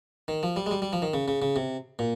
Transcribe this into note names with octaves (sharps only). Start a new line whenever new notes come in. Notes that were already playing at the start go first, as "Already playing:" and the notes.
D#3
F3
G3
G#3
G3
G3
F3
D#3
C#3
C#3
C#3
C3
A#2